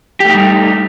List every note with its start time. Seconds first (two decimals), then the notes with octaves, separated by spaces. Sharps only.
0.20 G4
0.25 A3
0.30 D#4
0.34 G3